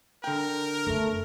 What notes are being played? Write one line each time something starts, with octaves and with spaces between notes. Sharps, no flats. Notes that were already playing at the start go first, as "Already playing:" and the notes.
D3 A#4 G5
F#2 A3 B3